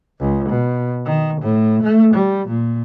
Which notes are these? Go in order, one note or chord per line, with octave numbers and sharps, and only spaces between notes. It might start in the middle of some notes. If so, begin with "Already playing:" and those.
C#2
B2
D#3
A2
A3
G3
A#2